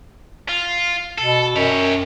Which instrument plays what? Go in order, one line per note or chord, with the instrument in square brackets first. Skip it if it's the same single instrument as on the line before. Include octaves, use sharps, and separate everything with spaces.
[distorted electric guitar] F4
[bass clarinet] B2 [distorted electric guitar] A4
[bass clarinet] F#2 [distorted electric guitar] G4 C#5